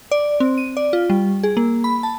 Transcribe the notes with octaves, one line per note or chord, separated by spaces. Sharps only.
D5
C4
D#7
D5
F4
G3
G#4
A#3
B5
A5